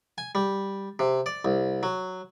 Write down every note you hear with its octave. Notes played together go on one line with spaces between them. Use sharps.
G#5
G3
C3
D5
C2
F#3